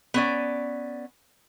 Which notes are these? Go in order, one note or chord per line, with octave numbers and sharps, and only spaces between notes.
B3 C#4 D5